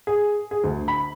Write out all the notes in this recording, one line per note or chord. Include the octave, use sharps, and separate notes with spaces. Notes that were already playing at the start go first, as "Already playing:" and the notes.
G#4
G#4
D2
B5